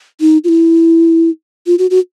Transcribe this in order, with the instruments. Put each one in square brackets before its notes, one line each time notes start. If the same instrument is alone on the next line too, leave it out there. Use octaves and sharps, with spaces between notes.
[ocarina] D#4
F4
E4
F4
F#4
F#4